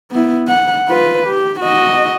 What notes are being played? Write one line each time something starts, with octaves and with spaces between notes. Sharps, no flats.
B3 E4
F#5
F4 B4
G4
F#4 D#5